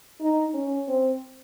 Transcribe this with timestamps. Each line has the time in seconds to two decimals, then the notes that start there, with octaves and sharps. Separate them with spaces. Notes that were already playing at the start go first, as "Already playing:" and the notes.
0.20 D#4
0.54 C#4
0.88 C4